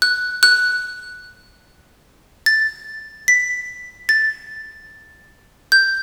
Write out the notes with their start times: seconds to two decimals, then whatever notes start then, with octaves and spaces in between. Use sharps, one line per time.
0.02 F#6
0.43 F#6
2.46 A6
3.28 B6
4.09 A6
5.72 G6